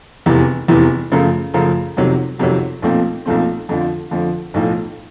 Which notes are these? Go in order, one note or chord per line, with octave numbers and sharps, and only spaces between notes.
F1 E2 C3 E3
F1 E2 C3 E3
F#2 C#3 F3 A3
F#2 C#3 F3 A3
F2 C3 D#3 F#3
F2 C3 D#3 F#3
B1 A#2 F3 A3 C4
B1 A#2 F3 A3 C4
F2 D3 F3
F2 D3 F3
B1 A2 F3